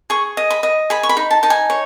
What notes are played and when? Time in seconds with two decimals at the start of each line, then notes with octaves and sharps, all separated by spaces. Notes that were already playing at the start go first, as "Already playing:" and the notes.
0.10 G#4 C#6
0.37 D#5
0.50 B5
0.63 D#5
0.90 G#4 B5
1.03 C#6
1.09 B5
1.17 D#4
1.31 A5
1.43 D#4 A5
1.50 G#5
1.70 C#5